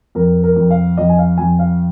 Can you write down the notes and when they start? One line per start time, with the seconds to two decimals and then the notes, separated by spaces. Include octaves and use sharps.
0.15 F2 A#4
0.43 A#4
0.56 F2
0.70 F5
0.97 F2 D#5
1.10 G#5
1.18 F5
1.38 F2 G#5
1.59 F5